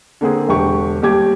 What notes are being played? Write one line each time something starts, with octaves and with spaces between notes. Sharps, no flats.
D3 A#3 C4 G#4
E1 D3 G4 C#6
D#2 G3 G4 D6 G#6